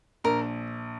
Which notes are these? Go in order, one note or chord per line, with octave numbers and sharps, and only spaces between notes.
A#1 A#4